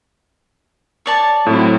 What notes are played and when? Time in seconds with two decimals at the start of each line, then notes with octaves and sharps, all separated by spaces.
1.06 C#5 D5 A5
1.46 A2 F#3 C4 E4